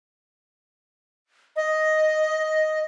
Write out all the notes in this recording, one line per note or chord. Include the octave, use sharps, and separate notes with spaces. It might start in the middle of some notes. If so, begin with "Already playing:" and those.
D#5